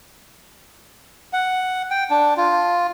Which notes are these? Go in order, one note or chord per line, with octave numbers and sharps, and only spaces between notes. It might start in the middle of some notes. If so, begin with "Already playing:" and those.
F#5
G5
D4
F4